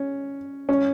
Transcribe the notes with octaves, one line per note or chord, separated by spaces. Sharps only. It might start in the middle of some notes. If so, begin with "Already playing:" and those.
Already playing: C#4
C#4